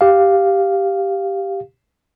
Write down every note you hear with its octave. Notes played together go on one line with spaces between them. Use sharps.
G4 F5